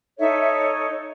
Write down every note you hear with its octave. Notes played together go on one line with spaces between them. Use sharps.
D#4 A4 C#5 E5
E5